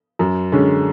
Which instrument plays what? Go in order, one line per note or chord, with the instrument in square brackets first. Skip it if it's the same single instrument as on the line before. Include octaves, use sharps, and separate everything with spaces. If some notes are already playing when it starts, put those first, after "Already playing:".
[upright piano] F#2
D3 G#3 C#4